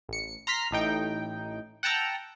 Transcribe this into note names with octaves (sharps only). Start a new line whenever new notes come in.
A1 C#7
A#5 C6 F6 B6
A1 A2 D#4 G5
F#5 G5 A5 A#5 E6